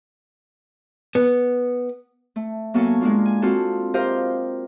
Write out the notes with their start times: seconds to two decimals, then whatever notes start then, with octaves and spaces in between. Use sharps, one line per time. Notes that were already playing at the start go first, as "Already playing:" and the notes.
1.15 B3
2.36 A3
2.74 F#3 A#3 B3 A4 G#5 C#6
3.01 G#3 A#3 D4 F4
3.26 G#5
3.42 C4 F4 F#4 A4
3.94 G4 A#4 C5 D#5 F5 G5